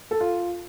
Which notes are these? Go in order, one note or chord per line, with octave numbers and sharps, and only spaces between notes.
A4
F4